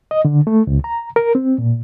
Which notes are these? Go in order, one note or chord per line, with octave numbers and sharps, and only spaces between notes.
D#5
D3
A3
C#2
A#5
A#4
C4
A#2